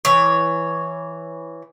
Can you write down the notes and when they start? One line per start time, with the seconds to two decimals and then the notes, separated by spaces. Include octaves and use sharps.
0.05 E3 C#5